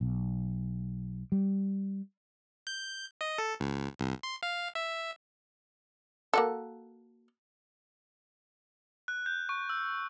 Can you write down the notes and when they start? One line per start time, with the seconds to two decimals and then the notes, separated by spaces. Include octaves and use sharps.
0.01 B1
1.32 G3
2.67 G6
3.21 D#5
3.38 A4
3.60 C#2
3.99 C2
4.23 C6
4.43 F5
4.75 E5
6.34 A#3 F#4 A4
9.08 F#6
9.26 G6
9.49 C#6
9.69 E6